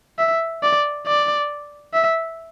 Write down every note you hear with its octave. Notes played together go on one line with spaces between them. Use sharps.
E5
D5
D5
E5